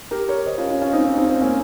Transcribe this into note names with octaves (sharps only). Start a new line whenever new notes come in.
G4 A#4
A#4 C#5
C5 D#5
C#4 F4
C#4 F4
C#4 F4
C4 D#4
C4 D#4
C4 D#4
C#4
C4
A#3 C#4